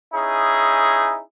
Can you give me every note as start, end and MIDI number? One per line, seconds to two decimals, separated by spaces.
0.13 1.19 61
0.13 1.19 63
0.13 1.19 64
0.13 1.19 68